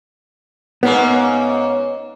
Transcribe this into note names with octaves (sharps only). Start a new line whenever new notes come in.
G#2 A#3 B3 C#4